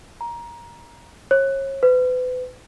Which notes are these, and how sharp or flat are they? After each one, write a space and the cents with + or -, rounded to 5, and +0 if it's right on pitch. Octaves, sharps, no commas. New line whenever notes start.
A#5 +15
C#5 -35
B4 +35